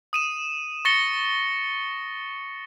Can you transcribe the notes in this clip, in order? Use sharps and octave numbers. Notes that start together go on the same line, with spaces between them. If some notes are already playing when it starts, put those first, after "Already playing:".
D#6 D#7 E7
C#6 A6 A#6 C#7 G7